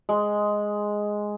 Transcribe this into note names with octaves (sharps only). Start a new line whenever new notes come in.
G#3